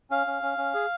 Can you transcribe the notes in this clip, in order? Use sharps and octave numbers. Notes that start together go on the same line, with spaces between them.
C#4 F5
C#4
C#4
C#4
G#4